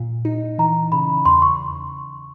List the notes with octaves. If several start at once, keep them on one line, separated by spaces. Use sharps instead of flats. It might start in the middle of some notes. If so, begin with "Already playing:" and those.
Already playing: A#2
D#4
E3 A#5
C#3 B5
E2 C6
C#6